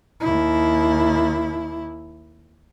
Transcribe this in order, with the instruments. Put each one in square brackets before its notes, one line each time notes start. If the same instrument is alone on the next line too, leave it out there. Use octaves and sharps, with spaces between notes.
[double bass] D#2 E4